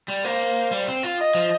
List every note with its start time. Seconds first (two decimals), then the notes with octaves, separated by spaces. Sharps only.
0.08 G3
0.24 A#3 C5
0.71 G3
0.87 C4
1.03 F4
1.19 D#5
1.35 F3